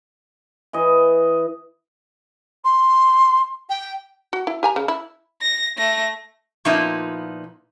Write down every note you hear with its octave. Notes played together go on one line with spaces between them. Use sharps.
E3 D#5
C6
G5
F#4
E4
G4 G#5 A#5
C#3
E4
A#6
A3 A#6
A#2 F3 A#3 B3 D#4 E4